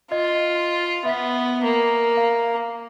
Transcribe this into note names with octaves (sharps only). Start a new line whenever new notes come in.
F4 D#5
B3 E5 B6
A#3
F5